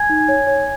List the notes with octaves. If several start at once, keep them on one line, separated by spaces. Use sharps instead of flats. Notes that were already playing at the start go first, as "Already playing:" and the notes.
Already playing: G#5 G#6
D#4
C#5
C#5